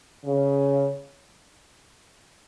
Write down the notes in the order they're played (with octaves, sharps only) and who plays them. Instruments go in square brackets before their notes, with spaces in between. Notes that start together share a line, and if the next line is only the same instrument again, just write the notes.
[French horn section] C#3